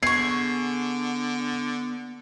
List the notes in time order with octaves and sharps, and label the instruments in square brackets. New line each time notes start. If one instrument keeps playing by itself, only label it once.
[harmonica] D3 [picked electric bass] B3 [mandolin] G#4 C#6 [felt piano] C7